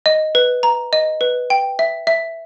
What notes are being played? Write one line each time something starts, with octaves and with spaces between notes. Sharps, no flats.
D#5
B4
A#5
D#5
B4
G5
E5
E5